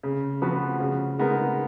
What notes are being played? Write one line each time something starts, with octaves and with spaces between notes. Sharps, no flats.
C#3
F3 B3 F#4 B4
C#3
G#3 B3 D#4 A#4